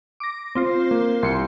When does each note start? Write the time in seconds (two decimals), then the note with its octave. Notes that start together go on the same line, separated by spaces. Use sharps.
0.20 D6 A#6
0.55 C4 F4 C5
0.91 A#3
1.23 C2 C6 C#7